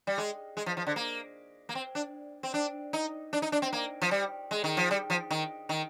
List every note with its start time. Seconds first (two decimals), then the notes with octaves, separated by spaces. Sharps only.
0.07 G3
0.18 G#3
0.57 G#3
0.66 F3
0.77 F3
0.87 D3
0.96 A#3
1.69 A#3
1.75 C4
1.95 D4
2.43 C4
2.54 D4
2.93 D#4
3.33 D4
3.42 D#4
3.52 D4
3.62 C4
3.73 A#3
4.02 F3
4.11 G3
4.51 G#3
4.64 D#3
4.77 F3
4.91 G3
5.10 F3
5.31 D#3
5.69 D#3